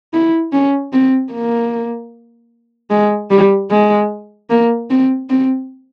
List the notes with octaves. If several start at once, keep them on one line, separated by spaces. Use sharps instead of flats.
E4
C#4
C4
A#3
G#3
G3
G#3
A#3
C4
C4